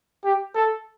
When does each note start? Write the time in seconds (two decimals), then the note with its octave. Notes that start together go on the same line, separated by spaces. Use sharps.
0.24 G4
0.55 A4